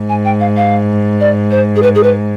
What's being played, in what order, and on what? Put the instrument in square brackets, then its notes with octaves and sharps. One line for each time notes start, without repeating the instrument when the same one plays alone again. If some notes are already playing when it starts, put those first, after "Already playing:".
Already playing: [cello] G#2
[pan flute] G#5
G5
F5
F5
D5
C5
G#4
B4
G#4
B4